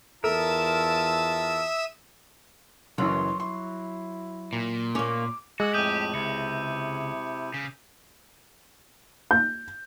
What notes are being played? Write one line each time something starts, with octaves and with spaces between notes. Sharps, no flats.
E2 F4 A4 A#4 E5 A5 D#6 E6
F#1 F#2 E3 F#3 C6
E4 C6
A#2
A#3 C#4 D6
G#3 F#4 D6 E6 F#6
F2 A2 A3 G4 D#6 G6 D#7
C#2 C3 E4 C#7
C#3
G6